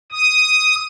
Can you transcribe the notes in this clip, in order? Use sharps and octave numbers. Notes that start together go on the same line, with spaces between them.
D#6